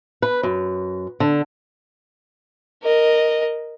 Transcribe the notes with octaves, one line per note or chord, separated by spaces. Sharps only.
B4
F#2
D3
A#4 D#5